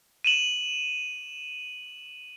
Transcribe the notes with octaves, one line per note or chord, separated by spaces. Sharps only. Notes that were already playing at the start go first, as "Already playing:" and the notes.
D#7 E7 F#7